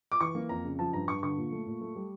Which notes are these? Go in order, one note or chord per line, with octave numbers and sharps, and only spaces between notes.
D6
E3 C#6
A#3
F2 A#5
C#3
F3 A5
G2 A#5
G2 C#6
D3 C#6
A#2
A3
A#2
A3
G3